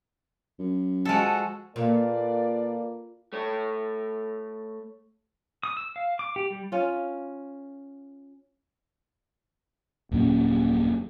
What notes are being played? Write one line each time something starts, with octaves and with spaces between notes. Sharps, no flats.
F#2
F3 G#3 F#4 A4
A#2 A#3 A4 B4 D5
A3 C#5
D#6
E6
F5
D6
G4
G3
C#4 F4
D#1 F#2 A#2 C#4